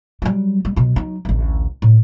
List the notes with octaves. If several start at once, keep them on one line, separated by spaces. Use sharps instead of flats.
F#3 G3
G3
B2 F#3
F#3 D#4
A1 D2
A2